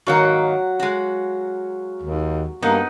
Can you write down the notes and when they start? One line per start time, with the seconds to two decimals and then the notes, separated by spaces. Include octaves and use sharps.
0.07 G#2 D#3 F#3 A#3 F5 F#5
0.80 G#3 F#4
2.03 D#2
2.62 G2 A#3 B3 D#4